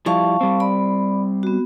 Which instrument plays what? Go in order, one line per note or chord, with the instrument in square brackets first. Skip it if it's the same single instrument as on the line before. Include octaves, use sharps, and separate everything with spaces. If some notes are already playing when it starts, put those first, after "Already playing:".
[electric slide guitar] F3 G3 E4 [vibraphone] F5 A5 C#6
[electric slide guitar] G3 C4
[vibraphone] D5 B5
B3 F#4